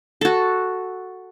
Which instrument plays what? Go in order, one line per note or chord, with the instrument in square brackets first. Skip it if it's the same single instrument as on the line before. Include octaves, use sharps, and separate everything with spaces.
[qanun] F#4 A4